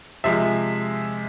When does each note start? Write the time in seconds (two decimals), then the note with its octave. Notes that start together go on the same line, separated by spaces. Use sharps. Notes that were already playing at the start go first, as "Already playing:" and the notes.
0.24 C3 F3 G#3 E5